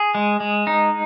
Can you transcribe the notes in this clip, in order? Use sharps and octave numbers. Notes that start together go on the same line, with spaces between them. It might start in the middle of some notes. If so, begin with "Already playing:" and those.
Already playing: G#4
G#3
G#3
D#4